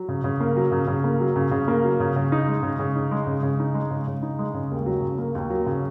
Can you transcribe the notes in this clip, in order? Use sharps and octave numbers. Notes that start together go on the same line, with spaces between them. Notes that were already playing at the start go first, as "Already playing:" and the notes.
Already playing: F#3
C#3
C#3
A#3
F#3
C#3
C#3
A#3
F#3
C#3
C#3
A#3
F#3
C#3
C#3
D#4
G#3
C#3
C#3
D#4
G#3
C#3
C#3
D#4
G#3
C#3
C#3
D#4
G#3
C#3
D#2
F#3
C#3
A#3
D#2
F#3
C#3